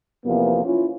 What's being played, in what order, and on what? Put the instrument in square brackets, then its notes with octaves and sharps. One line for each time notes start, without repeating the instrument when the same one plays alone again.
[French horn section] E2 C3 F3 A#3 B3
C#4 E4 F4